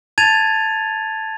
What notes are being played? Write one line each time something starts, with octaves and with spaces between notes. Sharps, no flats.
A5 G#6 A6 D#7 F7